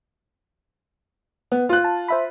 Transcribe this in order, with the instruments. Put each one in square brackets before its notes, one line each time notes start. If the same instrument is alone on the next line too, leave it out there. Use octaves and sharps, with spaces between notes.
[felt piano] B3
F4 F#6
[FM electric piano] A5
C5 E5 B5